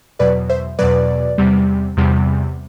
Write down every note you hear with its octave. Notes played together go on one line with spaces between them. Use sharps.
E2 B2 F#3 B4 D5
C5 E5
E2 B2 F#3 B4 D5
E2 C3 G3
E2 C3 G3